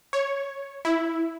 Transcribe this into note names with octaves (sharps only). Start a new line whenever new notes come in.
C#5
E4